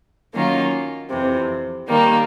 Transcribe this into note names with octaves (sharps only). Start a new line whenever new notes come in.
D#3 F#3 A#3 C#4 F4
F2 C3 E3
D#3 G3 A#3